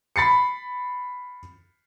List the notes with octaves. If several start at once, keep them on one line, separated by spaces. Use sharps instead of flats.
B5 A6 C7 C#7